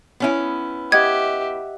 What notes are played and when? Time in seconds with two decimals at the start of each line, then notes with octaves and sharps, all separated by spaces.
0.20 B3 C#4 E4
0.92 G4 D#5 E5 F#5 G#6